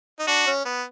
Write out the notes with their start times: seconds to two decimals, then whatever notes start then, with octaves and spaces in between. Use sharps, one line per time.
0.19 D#4
0.27 D4 F#4
0.47 C#4
0.65 B3